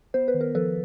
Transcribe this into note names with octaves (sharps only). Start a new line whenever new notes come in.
B3 C5
B4
D#3
A#4
F3 A4 B4